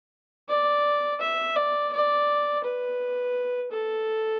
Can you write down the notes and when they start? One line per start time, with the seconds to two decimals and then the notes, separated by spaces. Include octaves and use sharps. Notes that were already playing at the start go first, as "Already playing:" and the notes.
0.48 D5
1.21 E5
1.56 D5
1.93 D5
2.64 B4
3.71 A4